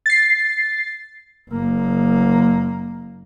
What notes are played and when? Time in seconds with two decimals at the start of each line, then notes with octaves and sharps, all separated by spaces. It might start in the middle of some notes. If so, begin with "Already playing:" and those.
0.06 A6 C7
1.50 F#1 A#3